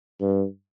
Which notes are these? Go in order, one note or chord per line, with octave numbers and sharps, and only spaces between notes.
G2